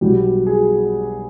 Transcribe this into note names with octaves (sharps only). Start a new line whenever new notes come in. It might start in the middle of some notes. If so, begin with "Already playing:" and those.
B1 B2 G3 G4
G#4